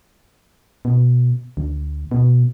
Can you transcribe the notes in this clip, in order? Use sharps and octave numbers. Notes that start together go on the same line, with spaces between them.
B2
D2
B2